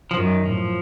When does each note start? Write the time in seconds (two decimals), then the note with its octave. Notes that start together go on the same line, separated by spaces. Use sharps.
0.11 F3
0.17 F#2 D#3
0.46 A2 F3